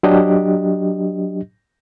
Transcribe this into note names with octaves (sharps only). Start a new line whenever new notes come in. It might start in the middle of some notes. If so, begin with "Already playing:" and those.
F#3 D4 G4 D#5